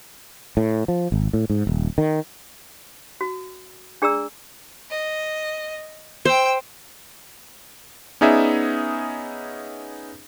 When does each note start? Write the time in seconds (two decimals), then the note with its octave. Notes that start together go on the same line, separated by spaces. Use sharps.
0.57 A2
0.88 F3
1.12 G#1
1.33 A2
1.50 G#2
1.67 D#1
1.98 D#3
3.21 F#4
4.02 D4 G#4 D5 A#5 E6
4.91 D#5
6.25 C5 G5 E6
8.21 B3 C#4 D#4 G#4 D5 E5